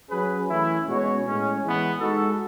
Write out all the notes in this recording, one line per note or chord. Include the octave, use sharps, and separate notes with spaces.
F#3 C#4 G#4 B4
E3 A3 C#4 E4
B2 G#3 C#4 F#4 C#5
A2 G#3 C#4
E3 G#3 B3
G#3 D#4 F#4 A4